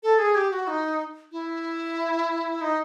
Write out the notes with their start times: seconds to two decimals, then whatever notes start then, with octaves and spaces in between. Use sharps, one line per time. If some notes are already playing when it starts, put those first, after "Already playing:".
0.03 A4
0.19 G#4
0.35 G4
0.51 F#4
0.67 D#4
1.32 E4
2.61 D#4